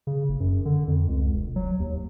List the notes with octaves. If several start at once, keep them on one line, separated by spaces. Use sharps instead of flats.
C#3
F#1
F#2
D3
F2
C#2
E1
F#3
D#2